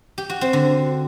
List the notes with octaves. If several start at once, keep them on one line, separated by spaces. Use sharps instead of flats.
G4
F#4
C4
D3